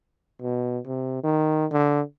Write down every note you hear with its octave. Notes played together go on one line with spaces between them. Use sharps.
B2
C3
D#3
D3